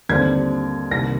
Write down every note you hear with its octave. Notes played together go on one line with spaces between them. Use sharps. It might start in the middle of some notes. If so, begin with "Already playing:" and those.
D#2 D3 G3 C4 G#6
C2 C3 D#3 A#3 A#6